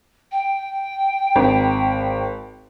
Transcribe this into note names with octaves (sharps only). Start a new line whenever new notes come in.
G5
G#1